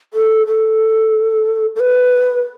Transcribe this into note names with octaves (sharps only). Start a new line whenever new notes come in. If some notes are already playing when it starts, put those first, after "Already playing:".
A4
A4
A4
B4